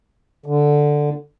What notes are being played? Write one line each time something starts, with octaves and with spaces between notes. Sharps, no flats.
D3